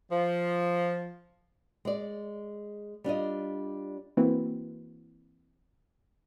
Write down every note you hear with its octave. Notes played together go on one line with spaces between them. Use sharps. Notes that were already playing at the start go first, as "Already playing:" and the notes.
F3
G#3 D5
G3 D4 F4 D#5
E3 A#3 C4 E4 F#4 B4